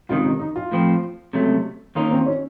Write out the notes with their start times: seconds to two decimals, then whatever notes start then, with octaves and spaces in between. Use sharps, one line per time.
0.09 C#2 C3 D#3 F4
0.24 D#4
0.40 D#4
0.56 F4
0.72 A2 F3 C4
1.33 C#2 C3 F#3 A3
1.95 D#2 D#3 A#3 C#4 D#4 F4
2.11 C4
2.26 C#4